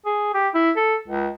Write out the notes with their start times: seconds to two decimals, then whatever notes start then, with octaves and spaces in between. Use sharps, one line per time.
0.06 G#4
0.34 G4
0.54 E4
0.76 A4
1.08 C#2